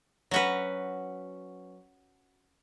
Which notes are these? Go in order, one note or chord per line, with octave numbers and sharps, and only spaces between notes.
F#3 C#4 F#4 B4